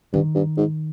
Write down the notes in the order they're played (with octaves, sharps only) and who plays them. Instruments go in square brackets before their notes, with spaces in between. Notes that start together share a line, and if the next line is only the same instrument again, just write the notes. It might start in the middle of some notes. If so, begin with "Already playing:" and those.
[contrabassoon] G2 [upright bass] D#3
[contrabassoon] G2
G#2